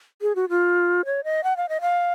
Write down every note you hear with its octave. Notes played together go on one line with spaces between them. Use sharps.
G#4
F#4
F4
C#5
D#5
F#5
F5
D#5
F5